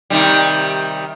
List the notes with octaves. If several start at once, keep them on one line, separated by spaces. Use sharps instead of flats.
C3 D#3 G3